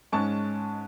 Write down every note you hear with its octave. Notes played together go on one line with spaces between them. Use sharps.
G#2 G#3 C#4 A5 C#6